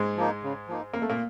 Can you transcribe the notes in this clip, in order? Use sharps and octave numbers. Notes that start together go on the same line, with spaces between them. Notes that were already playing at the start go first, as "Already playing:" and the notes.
Already playing: G#2 G#3
F3 A#3 D#4
C#3
F3 A#3 D#4
F2 A#3
A3
A#2 A#3